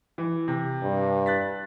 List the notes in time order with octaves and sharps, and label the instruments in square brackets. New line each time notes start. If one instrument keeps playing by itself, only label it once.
[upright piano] E3
C3
[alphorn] G2
[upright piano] F#6 A6 B6